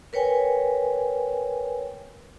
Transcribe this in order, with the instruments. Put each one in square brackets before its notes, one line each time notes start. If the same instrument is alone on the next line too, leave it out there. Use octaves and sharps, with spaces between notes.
[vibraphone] A#4 B4 C#5 G5 G#5